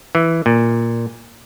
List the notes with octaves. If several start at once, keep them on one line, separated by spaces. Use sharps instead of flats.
E3
A#2